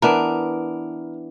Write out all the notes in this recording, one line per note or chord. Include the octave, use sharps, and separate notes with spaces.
E3 B3 D4 A#4